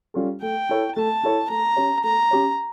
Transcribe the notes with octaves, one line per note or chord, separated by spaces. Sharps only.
G3 C#4 F4 A4
A3 G5
E4 A4 C#5
A3 A5
E4 A4 C#5
A3 A#5
C#4 G4 C#5
A3 A#5
C#4 G4 C#5